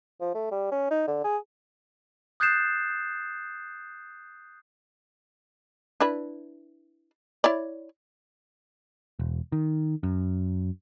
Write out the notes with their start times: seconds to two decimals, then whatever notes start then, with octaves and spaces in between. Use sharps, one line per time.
0.21 F3
0.35 A3
0.51 G3
0.72 C#4
0.91 D#4
1.07 D3
1.24 G#4
2.40 D#6 F#6 G6 A6 C7 E7
6.00 D4 E4 B4
7.44 E4 C#5 D5
9.19 E1
9.52 D#3
10.03 F#2